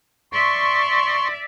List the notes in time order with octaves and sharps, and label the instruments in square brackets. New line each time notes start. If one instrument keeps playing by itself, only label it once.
[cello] D5 E5 [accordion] C6 C#6